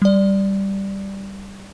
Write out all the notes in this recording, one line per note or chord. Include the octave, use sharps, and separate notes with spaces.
G3 D5